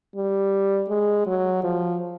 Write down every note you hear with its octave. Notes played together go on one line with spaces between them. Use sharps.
G3
G#3
F#3
F3